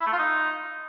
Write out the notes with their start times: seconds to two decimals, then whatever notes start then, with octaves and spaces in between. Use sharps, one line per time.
0.01 E4
0.07 A3
0.13 F4
0.19 D#4